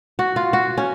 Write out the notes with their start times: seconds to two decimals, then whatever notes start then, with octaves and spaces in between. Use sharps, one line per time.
0.19 F#4
0.36 F4
0.53 F#4
0.78 C#4